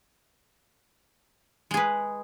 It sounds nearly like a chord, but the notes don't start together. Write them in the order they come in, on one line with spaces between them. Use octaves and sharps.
G#3 G#4 B4